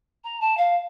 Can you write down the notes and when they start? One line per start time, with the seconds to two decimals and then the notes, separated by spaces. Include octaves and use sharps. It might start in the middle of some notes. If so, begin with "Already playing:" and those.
0.24 A#5
0.40 A5
0.57 F5